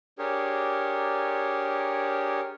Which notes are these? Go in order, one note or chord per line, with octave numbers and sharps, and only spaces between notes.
D4 G4 G#4 A#4 C#5